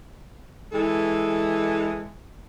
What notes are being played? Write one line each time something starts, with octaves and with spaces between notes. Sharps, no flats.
E3 G#3 A4